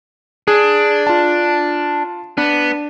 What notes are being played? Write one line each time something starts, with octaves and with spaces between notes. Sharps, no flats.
D4 G#4
F4 A5
B3 D4